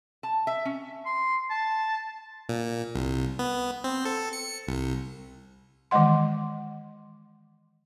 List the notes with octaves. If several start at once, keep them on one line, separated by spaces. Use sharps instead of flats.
A5
E5
C#4
C6
A5
A#2
C2
B3
C4
A4
C#7
C2
D#3 E3 G#3 D#5 F#5 C6